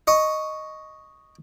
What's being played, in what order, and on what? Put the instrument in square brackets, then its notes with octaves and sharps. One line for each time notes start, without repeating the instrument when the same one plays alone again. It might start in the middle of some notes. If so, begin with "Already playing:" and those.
[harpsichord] D#5 C#6 D#6